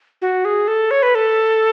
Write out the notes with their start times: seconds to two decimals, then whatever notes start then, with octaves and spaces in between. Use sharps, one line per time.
0.22 F#4
0.45 G#4
0.68 A4
0.91 C#5
1.03 B4
1.15 A4